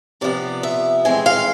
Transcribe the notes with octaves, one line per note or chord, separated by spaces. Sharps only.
C3 F3 B3 D5
E5
A2 E3 G#3 C4 G#5
F5